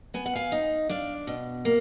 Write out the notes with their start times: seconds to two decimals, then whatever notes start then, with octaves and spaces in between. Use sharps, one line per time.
0.14 B3 G#5
0.26 F#5
0.35 F5 G#5
0.52 D#4
0.89 D4 D5 F5
1.27 B2
1.65 A#3